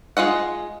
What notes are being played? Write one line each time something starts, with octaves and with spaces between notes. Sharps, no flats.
G#3 F4 D#5 F#5